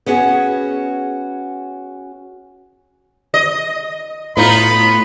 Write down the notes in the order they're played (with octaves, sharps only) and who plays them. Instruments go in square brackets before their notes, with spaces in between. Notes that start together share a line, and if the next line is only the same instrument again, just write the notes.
[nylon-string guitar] B3 C#4 F#4 G#4
[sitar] D#5
[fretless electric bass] A2 [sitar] B3 D#4 F4 [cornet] B5